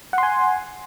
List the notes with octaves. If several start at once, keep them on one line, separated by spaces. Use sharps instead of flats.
F#5 G#5 C6